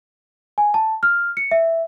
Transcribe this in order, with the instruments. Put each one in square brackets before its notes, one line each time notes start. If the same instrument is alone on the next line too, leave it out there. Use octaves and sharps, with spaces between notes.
[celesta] G#5
A5
F6
C#7
E5